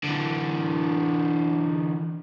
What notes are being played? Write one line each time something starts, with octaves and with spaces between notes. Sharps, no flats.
D3 E3